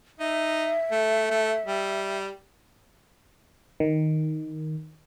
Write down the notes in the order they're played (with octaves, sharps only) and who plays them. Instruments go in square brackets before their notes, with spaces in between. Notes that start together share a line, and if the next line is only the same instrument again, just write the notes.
[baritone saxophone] D#4 [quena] E5
[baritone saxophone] A3
A3
G3
[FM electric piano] D#3